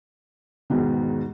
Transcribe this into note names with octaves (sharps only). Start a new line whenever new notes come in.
E2 G#2 B2 D#3